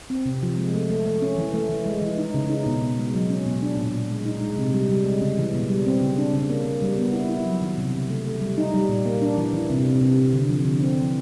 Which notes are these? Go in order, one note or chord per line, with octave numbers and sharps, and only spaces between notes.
C4
C3
F3
G#3
A3
A3
A3
C#4
E3
A3
E3
G#3
E3
D#4
C#3
D#4
B2
B2
G#3
F#3
C#4
B2
D4
A#2
A#2
G#3
D#4
G#3
C3
G3
G3
G#3
C#3
E3
B2
G3
C4
C#3
D4
C#3
A#3
A#3
G3
B3
E4
E4
F#3
D#3
C3
C#3
A3
A3
G3
D#4
G3
A#2
A#3
D4
E3
E3
C3
C3
C3
C3
D3
F3
D3
C4
E3